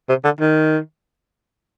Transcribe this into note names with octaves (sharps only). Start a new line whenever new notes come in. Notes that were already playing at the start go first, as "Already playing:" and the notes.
C3
D3
D#3